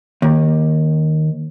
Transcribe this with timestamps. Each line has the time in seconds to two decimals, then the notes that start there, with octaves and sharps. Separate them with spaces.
0.22 D#2